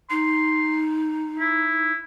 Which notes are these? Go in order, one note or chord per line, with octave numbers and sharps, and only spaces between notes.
D#4 C6
E4